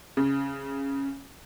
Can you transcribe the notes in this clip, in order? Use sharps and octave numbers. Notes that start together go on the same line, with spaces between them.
C#3